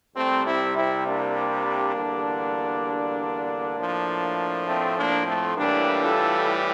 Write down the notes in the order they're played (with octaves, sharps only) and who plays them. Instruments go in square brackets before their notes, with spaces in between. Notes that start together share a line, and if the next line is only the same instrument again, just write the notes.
[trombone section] C2 C3 G3 A3 C4
C4 E4
C4 E4
A#3 D4
E2 D3 G3
A2 F3
A3 C4
A#3 D4
A3 C4
A2 E3 G3 A#3 D4
F4 A4